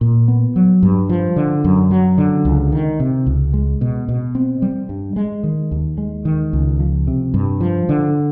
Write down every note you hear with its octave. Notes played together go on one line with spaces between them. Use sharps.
A#2
B3
F#3
G2
F3
D3
F#2
F#3
D3
C#2
D#3
C3
C#2
G#3
B2
B2
C4
G3
G2
G#3
D#3
D#2
G#3
D#3
C#2
F3
C3
G2
F3
D3